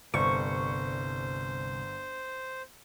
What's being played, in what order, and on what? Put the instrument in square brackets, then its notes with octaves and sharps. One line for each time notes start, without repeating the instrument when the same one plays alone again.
[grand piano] G1 [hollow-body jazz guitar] C2 [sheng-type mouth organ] C5 [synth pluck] C#6